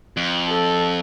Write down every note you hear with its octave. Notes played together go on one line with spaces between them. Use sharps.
F2
A4